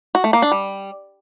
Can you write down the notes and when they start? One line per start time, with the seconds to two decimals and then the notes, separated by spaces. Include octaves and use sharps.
0.15 F#4
0.24 A3
0.33 A#3
0.42 D4
0.52 G3